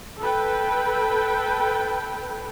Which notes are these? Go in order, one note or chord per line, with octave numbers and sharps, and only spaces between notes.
A4 B4 G5